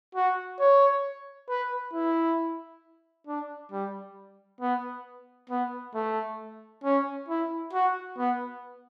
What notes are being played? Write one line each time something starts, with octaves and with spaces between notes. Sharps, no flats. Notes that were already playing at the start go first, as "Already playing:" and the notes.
F#4
C#5
B4
E4
D4
G3
B3
B3
A3
C#4
E4
F#4
B3